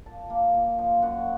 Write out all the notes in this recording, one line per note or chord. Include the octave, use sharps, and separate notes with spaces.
A#2 A5
A#3
A#2
F3
F#2 F#5